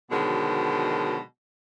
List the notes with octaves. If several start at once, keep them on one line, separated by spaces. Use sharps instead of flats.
B2 D3 D#3 F3 F#3 G#3